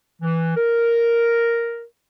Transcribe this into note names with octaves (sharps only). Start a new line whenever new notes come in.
E3
A#4